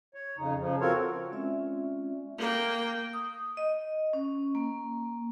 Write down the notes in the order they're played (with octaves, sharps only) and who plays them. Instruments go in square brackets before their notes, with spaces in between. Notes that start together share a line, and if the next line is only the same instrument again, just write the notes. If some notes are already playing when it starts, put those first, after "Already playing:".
[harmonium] C#5
F2 C#3 D#4
C#3 F3
C4 F4 F#4 A4 A#4 C#5
[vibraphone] G#3 C4 C#4 F4 D5 E5
[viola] A#3 G5
[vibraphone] D#6
D#5
C#4
A#3